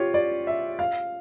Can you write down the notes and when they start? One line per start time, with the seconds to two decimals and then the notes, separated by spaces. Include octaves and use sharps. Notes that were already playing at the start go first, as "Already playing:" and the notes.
Already playing: F4 G4 C#5
0.14 D5
0.47 E5
0.79 F5